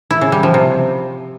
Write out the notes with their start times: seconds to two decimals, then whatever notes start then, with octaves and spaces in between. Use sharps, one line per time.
0.11 E4
0.21 C#3
0.32 G3
0.43 F3
0.54 C3